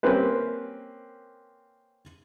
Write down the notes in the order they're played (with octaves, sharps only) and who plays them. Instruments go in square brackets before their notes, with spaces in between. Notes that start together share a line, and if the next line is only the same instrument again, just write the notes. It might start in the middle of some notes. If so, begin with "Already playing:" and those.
[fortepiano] A#3 C4 C#4 G4 B4 C5